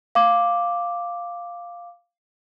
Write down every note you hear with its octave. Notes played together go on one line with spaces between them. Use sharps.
F5 D6